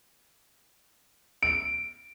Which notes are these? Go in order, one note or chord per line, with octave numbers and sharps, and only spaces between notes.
D7